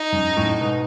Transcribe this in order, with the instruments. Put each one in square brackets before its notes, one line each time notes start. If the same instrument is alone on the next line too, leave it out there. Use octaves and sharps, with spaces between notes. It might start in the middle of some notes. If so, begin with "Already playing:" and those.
Already playing: [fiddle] D#4
[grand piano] F#2
G#2
F#2 A2
G#2 B2